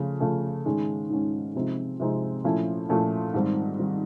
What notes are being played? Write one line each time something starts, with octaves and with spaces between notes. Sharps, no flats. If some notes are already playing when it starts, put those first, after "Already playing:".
Already playing: C#3 F3 A3
C#3 F3 A3
G#2 D#3 G#3 C#4
G#2 D#3 G#3 C#4
C3 F3 G#3 C4 D#4
C3 F3 G#3 C4 D#4
A#2 F3 A3 C#4 E4
A#2 F3 A3 C#4 E4
G#2 D#3 G3 C4
D#3 G3 C4